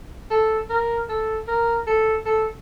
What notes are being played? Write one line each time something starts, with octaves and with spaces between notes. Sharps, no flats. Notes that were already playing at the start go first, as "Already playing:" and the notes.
A4
A#4
A4
A#4
A4
A4